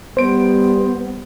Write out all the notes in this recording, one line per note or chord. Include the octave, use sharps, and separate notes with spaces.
G3 B3 C5 D7